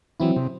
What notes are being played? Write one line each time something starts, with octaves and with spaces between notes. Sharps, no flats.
E3 F#3 C4 E4
C3